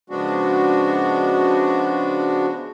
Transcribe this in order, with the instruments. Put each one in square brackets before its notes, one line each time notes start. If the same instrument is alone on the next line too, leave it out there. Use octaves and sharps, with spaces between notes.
[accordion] C#3 F3 G#3 B3 D4 F#4